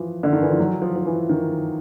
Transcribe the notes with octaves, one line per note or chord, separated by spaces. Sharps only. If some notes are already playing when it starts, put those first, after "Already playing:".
Already playing: E3 F3
D3
D#3
E3
F3
F#3
F3
F3
E3
D#3